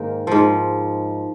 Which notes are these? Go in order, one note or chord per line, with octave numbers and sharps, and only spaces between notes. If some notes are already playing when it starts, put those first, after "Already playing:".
Already playing: G#2 D#3 A#3
G#2 F3